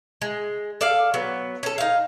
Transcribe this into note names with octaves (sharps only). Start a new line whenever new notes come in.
G#3
A4 D5 F5
F#3 B3
C#4 A4
D#4 F5